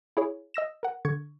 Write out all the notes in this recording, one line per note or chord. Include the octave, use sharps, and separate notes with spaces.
E4 G#4 C#5
D#5 E6 A#6 E7
A#4 F#5
D3 C#6 G#6